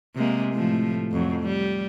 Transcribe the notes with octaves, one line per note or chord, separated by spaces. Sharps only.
C3 G#3 A#3
A2 F3 A3
F2 F#3
G3